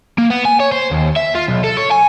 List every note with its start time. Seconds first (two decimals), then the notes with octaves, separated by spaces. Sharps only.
0.18 A#3
0.30 B3
0.45 G#5
0.60 C#5
0.72 C5
0.91 D#2
1.16 E5
1.35 F4
1.48 B1
1.64 A4
1.77 C#5
1.91 G#5